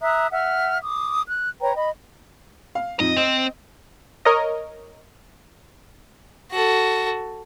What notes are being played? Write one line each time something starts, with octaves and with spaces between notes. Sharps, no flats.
E5 A#5 D#6 F#6
E5 F#5 F6
D6 D#6
F#6
B4 C#5 G5 A#5
D#5 B5
F5
F2 D#4 D#5
C4 D#5
A#4 C#5 D#5
F#4 A4